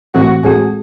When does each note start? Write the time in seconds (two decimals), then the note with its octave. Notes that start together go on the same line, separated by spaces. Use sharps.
0.15 A2 E3 A3 C4 F#4
0.43 A2 G#3 C4 F#4 G#4 A4